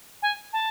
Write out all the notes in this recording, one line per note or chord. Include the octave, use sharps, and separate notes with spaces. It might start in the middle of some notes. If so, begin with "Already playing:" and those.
G#5
A5